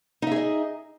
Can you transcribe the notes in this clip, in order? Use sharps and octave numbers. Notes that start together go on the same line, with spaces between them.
D#4 G#4 D#5 E5